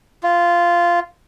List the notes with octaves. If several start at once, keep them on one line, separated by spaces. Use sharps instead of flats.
F4